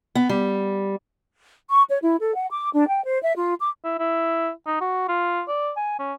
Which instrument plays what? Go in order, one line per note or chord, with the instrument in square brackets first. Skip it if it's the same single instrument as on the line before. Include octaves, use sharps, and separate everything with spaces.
[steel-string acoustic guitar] B3
G3
[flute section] C#6
C#5
E4
A4
F#5
D6
D4
G5
C5
E5
F4
D6
[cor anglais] E4
E4
D#4
F#4
F4
D5
G#5
C#4